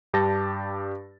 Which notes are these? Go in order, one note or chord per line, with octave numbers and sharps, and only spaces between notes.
G2 D4 G4 A5 A6 A#6